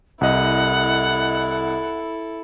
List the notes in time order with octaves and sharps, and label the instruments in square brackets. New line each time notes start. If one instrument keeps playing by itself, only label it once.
[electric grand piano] C2 D#5 [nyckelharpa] E4 A4 [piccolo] F#5